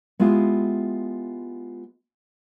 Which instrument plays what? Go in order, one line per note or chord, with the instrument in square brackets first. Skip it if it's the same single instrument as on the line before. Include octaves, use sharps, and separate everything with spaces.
[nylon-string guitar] G#3 B3 E4 F4 G4 F5